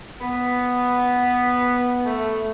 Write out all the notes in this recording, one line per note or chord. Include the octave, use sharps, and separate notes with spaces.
B3
A3